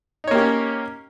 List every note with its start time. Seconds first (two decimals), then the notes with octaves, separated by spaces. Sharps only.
0.24 D#4
0.27 C#5
0.31 A#3
0.35 G4
0.38 C#4